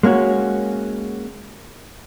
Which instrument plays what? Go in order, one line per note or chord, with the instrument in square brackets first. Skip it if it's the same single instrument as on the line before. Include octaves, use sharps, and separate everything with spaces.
[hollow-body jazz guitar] G#3 A#3 C#4 F#4